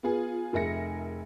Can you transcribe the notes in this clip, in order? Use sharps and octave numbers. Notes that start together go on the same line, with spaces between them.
B3 F4 G#4
F1 G#4 A#4 E5 A#6 C#7